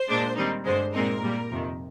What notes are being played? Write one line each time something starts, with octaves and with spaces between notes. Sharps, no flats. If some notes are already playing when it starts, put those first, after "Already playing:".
Already playing: C5
A#2 G#3 D4
D#3 G3 C4 D#4
G2 D3 G#3 C5
A#2 G#3 C4 D#4 A#4
A#2 G3 A#3
F2 C3 D#3